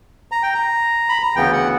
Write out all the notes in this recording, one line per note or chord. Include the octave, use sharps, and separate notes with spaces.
A#5
G5
A#5
B5
A#5
D2 C#3 E3 B3 G5
F#5